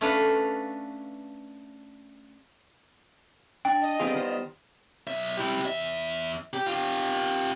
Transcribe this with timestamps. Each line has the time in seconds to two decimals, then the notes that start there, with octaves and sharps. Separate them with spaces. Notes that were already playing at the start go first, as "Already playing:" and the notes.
0.01 A3 C#4 D4 A4 B4 F5
3.65 D4 G5
3.82 D#5
4.00 G3 B3 C4 F4 G#4
4.14 D#3 C5
5.07 B1 E5
5.37 E4 G4
5.65 E2 E5
6.53 G4
6.67 F4 G4